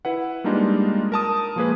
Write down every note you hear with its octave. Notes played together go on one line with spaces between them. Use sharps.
E4 B4 F#5
G3 G#3 A#3 D4 D#4 F4
A#4 A5 D#6
F3 G#3 A#3 G#4 B4